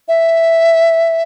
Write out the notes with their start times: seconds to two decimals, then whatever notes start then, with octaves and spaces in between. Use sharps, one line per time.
0.08 E5